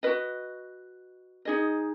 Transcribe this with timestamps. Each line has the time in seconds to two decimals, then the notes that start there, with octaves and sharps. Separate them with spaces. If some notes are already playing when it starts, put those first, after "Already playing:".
0.03 F#4 B4 D#5
1.45 D#4 G#4 D#5